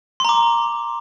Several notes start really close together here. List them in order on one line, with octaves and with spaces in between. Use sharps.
C6 A#5 D6